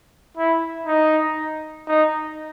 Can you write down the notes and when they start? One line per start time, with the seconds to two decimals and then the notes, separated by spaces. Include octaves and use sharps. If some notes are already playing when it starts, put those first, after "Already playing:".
0.37 E4
0.87 D#4
1.88 D#4